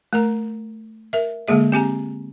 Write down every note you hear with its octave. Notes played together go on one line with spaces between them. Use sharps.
A3 A#4 A#5
A#4 E5
D3 G#3 A#3 G#4 E5
C4 G4 G#5 A#5